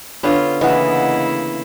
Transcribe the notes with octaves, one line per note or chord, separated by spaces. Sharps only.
D3 B3 C#4 F4
C#3 E3 A#3 B3 E4 D#5 F#5